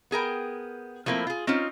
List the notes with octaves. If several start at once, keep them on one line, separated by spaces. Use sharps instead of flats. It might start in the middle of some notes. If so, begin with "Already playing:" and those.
B3 G#4 A#4 G5
F3 A3 A#3 C4 E4
F4 G#4
C4 C#4 D#4 F4